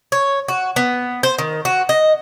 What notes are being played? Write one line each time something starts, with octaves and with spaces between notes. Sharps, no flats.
C#5
F#4
B3
C5
D#3
F#4
D#5